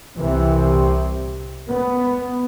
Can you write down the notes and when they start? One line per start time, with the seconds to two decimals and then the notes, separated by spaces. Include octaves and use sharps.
0.18 C2 C3 E3
1.70 B3